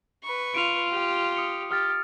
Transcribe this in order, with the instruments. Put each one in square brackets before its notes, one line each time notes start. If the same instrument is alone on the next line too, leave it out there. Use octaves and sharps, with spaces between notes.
[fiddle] B4 C#6
[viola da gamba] F4 [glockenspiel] D7 D#7 F7
[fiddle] G4
[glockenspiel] D#6 C#7
[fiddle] G4 [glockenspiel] D#6 F6 A6